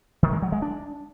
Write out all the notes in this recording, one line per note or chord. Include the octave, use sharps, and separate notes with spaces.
D#3
G#3
F#3
G#3
D4